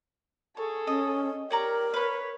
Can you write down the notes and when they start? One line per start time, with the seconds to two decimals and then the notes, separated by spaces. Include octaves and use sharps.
0.57 G#4 A4 C#5
0.87 C#4 D#5
1.50 G4 A#4 C#5 D5 A#5
1.94 B4 C#5 B5